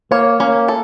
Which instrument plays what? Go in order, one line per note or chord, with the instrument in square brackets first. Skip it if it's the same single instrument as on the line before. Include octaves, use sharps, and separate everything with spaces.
[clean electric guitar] A#3 [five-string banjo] C#5
[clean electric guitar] A#3 [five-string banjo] C#4
[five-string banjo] A4